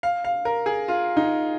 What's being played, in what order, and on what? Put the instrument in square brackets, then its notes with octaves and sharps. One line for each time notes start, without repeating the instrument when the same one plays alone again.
[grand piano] F5
F5
A#4
G#4
F4
D#4